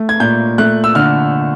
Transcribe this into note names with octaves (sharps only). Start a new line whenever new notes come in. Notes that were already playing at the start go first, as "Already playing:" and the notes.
Already playing: A3
G#6
A#2 G6
A3 F#6
E6
D3 F6